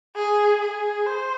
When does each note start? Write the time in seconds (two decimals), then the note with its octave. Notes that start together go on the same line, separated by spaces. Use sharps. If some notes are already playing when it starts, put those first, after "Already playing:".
0.16 G#4
0.62 G#4
1.06 C5